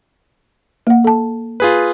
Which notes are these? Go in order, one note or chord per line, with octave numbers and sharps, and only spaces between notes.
A#3 F#5
A4 A5
F4 G#4 B4